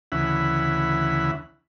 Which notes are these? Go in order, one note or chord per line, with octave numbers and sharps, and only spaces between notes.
D2 C#3 E3 E5 F#5 B5